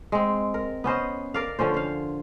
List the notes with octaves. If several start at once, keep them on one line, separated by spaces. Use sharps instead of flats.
G#3 C4
A#4
B3 C#4 C5 D#5
A#4 D5 F5
D3 F3 C#4 C5
C5 F5